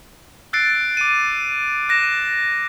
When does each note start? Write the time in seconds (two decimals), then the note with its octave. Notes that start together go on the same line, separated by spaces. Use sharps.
0.53 E6 F#6 A6 C7 D7
0.97 D6 D#7
1.89 F#6 A#6 D#7 E7